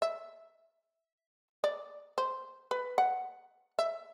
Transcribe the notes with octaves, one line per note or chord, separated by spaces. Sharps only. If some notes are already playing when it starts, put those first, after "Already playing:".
E5
D5
C5
B4
F#5
E5